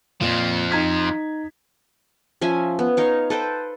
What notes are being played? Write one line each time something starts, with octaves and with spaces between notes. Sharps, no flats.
F2 A#2 F3
D#4 G#6 B6
F3 C#4 E5 G#5
B3
D#4 C#5 F5
A4 B4 C5 G5